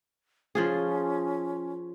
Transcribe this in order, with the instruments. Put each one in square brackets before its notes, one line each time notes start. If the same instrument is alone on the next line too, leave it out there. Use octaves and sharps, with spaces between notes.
[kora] F3 F4 G#4 [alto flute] C#4